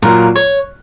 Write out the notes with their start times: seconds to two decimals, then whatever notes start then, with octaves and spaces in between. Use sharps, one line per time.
0.02 A#2 F#3 A#3 F4 A#4
0.36 C#5